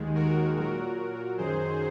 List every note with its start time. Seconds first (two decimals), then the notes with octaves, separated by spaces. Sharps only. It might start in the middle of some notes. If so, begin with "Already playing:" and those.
Already playing: D#2 D#3 G#3
0.15 F#4 A#4
0.56 A#2 F#3 F#4 A#4
1.38 F#2 D#3 F#3 G#4 C5